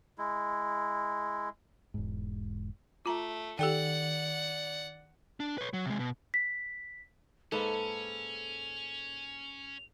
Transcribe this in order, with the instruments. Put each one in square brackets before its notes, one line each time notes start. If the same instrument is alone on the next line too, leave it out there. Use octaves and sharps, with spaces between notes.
[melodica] G#3 E4
[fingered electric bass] E1 G#2
[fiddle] A3 [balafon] F4 A#5
[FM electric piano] D#3 [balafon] G4 A4 G5 [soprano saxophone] D5 [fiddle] F#5
[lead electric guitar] D4
B4 C#5
F#3
C3 G#3
B2
[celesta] B6
[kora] G#2 A#3 B4 [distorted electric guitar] C#4 [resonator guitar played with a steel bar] A4 [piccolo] F7